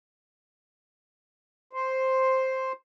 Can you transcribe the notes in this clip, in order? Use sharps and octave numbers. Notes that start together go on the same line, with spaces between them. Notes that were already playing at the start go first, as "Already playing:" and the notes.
C5